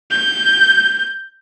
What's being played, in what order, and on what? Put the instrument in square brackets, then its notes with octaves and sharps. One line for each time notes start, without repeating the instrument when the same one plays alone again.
[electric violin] G6